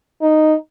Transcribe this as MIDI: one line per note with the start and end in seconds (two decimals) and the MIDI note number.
0.22 0.54 63